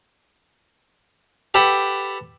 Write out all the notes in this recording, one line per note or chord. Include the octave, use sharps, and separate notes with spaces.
G4 A4 B4 F#5 G5